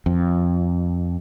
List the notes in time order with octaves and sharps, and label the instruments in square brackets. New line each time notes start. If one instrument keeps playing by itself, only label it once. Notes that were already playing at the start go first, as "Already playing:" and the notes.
[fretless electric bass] F2